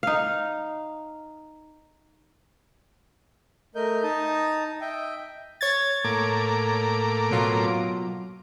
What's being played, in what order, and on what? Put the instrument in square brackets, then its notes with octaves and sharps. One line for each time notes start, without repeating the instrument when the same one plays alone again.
[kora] D#4 F5
[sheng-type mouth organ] A3 A#4 D#5 G6
D#4 A5 A#5 D#6
D#5 E5 G5
[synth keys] C#5 G#6 A6
[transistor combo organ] A2 A#3 D6
[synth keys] B2 F#3 F4